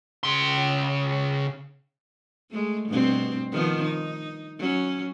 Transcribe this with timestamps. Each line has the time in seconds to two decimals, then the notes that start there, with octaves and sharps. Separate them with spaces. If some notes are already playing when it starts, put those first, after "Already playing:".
0.23 C#3 C6
2.51 G#3 A3
2.89 G2 B2 C4
3.52 D#3 F3 B3
3.84 D#4
4.59 F#3 C#4